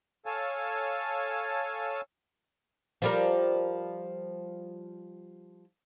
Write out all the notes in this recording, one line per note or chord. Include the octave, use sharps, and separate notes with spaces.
A4 C#5 F5 G#5 A5
F3 G3 A#4